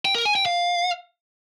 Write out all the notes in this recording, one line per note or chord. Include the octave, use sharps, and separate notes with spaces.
G5
A#4
G#5
G5
F5